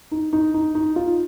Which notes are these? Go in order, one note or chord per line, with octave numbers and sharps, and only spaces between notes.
D#4
D#4
D#4
D#4
F4